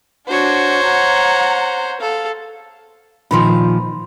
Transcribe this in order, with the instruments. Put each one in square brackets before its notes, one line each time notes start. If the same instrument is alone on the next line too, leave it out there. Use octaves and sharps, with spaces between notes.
[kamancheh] D4 F#4 [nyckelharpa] C5 C#5
[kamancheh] F#5 A#5
[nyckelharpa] A4 [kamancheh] F5
[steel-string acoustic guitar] A#2 D#3 F3 [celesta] B5 C6